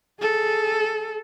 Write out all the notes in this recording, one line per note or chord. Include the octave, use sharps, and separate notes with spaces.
G#4 A4